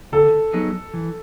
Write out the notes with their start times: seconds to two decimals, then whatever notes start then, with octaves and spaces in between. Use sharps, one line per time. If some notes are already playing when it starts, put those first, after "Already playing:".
0.12 D3 A4
0.53 F#3 B3 D#4 G#4
0.94 E3